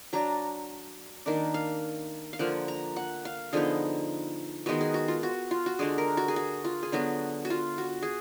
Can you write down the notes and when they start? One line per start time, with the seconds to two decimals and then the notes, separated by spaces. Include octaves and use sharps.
0.13 F#3 D4 A#5
1.26 D#3 A#3 D4
1.54 F5
2.33 F5
2.39 D3 F3 A#3 F#5
2.68 A#5
2.96 F#5
3.25 F5
3.53 D3 F3 B3 D#4 G#4
4.66 D#3 G#3 B3 F#4
4.81 G#4
4.94 F#4
5.08 F4
5.23 F#4
5.51 F4
5.66 F#4
5.79 D3 G#3 D4 G#4
5.98 A#4
6.17 F#4
6.28 G#4
6.36 F#4
6.65 F4
6.83 G#4
6.92 D3 F#3 B3 F#4
7.45 F#4
7.50 F4
7.78 F#4
8.02 G#4